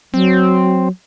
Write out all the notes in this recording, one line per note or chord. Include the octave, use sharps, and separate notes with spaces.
F#3 C4